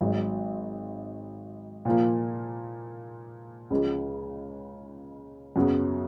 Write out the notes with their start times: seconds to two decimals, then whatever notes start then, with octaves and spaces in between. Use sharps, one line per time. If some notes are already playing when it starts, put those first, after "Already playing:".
0.01 G#1 G#2 F#3
1.85 A#2 F3 A#3
3.70 C#2 C#3 F3 G#3
5.56 F#2 C#3 F#3 B3